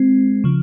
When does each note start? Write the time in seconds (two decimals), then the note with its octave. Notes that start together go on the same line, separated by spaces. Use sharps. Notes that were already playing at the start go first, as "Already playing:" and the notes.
Already playing: G#3 C4
0.44 C#3 F3